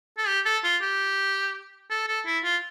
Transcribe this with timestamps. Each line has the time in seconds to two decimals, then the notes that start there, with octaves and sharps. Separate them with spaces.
0.18 A4
0.27 G4
0.45 A4
0.64 F4
0.82 G4
1.90 A4
2.07 A4
2.26 E4
2.44 F4